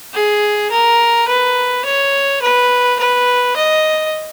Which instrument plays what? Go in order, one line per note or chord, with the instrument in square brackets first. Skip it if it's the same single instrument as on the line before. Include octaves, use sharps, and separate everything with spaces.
[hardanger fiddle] G#4
A#4
B4
C#5
B4
B4
D#5